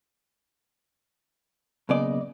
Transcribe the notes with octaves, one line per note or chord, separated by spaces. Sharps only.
B1 C#3 A#3 B3 D5 D#5